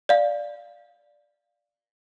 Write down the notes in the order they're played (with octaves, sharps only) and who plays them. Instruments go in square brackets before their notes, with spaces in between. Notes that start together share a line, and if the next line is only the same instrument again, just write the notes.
[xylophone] D5 F5